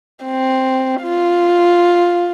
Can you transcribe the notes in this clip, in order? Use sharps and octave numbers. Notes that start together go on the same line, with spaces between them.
C4
F4